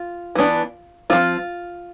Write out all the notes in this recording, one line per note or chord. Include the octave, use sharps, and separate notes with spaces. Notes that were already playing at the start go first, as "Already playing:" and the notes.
Already playing: F4
E3 B3 D4
F3 C4 F4